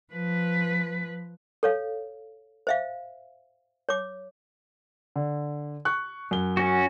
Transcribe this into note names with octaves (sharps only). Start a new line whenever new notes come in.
F3 B4
A4 C#5 F5
C5 E5 F5
C#5 D6
D3
C#6 F#6
F#2 G7
C#4 F#4